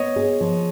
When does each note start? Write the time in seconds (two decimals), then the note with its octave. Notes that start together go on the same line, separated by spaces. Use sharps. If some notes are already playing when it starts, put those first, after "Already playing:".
Already playing: B3 C#5 D#5
0.16 G#4
0.41 F3